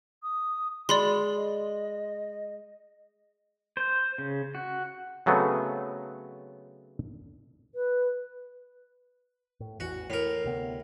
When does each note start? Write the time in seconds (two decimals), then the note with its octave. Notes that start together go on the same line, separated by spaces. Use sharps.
0.23 D#6
0.89 G#3 F#4 D5 B5 C6
1.36 D#5
3.77 C5
4.18 C#3
4.55 F#4
5.26 C#3 F#3 A3 B3 C4
7.75 B4
9.60 A2
9.80 A1 E2 E3 F#4
10.10 A2 E3 A#4
10.44 D2 C3 B3